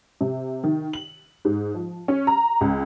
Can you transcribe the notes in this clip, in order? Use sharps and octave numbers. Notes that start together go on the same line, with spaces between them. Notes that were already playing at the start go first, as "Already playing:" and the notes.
C3
D#3
F#7
G#2
F3
C#4
A#5
C#2